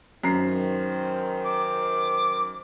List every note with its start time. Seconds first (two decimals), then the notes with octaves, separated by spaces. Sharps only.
0.23 F#2 D#3 C5 A#5 C7
1.45 D6